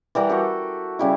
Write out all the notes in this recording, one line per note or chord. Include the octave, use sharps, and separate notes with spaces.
E3 G3 A#4 F#5
F#4 G4 A4
C#3 G3 E4